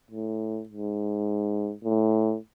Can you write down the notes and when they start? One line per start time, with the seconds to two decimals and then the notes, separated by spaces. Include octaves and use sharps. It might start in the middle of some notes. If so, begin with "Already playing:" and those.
0.11 A2
0.68 G#2
1.84 A2